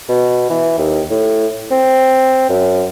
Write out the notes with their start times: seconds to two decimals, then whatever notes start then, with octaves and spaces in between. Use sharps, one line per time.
0.09 B2
0.50 E3
0.78 D#2
1.10 A2
1.71 C4
2.49 F#2